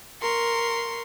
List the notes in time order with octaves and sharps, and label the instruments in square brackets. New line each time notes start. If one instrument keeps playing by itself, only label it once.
[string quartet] A#4 C6 C#6